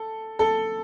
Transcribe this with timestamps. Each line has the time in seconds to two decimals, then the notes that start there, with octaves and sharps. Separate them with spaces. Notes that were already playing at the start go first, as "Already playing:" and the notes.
Already playing: A4
0.39 A4